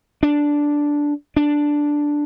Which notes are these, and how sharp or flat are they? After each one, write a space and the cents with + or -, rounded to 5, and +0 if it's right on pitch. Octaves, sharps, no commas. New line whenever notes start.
D4 -5
D4 +0